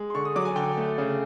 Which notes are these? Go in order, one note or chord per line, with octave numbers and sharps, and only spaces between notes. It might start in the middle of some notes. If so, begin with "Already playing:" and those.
Already playing: G#3
C6
D3 C#6
D#6
F#3 D6
G#5
D3 G5
A3
C#3